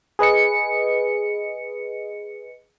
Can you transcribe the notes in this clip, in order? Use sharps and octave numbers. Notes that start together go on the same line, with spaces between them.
G#4 B4 D#5 C#7